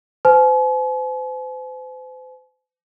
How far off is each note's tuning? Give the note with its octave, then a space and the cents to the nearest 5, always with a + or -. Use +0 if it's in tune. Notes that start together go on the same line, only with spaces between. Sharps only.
C5 -40 G#5 +45